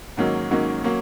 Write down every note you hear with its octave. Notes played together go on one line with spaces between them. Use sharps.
G#2 D#3 F#3 A#3 C#4
G#2 D#3 F#3 A#3 C#4
F#3 A#3 C#4